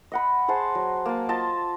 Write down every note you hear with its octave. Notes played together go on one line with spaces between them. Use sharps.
D#5 F#5 B5
G#4 C5 F#5 A5
F#3
A#3 A5
F4 D#5 A5